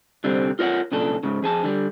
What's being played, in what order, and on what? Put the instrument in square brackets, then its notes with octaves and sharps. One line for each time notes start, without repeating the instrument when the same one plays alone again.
[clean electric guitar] C2 D3 G3 C4
F4 A#4 C#5 E5 F#5
B1 A#2 C#3 D4 A4
G#2 C#3
F2 G#4 A5
D3 G3